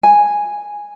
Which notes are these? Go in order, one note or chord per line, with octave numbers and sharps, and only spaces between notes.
G#5